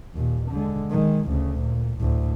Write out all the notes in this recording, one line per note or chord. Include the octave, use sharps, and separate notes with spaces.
D#2 A#2
D3 G#3
D#3 G#3
D2 C#3
A#2
D2 A2